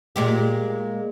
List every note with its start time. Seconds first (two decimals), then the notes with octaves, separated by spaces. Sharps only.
0.16 A#2 G#3 G4